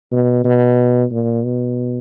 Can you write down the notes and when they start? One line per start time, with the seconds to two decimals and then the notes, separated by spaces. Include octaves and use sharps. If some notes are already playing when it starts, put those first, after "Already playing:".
0.12 B2
0.45 B2
1.12 A#2
1.45 B2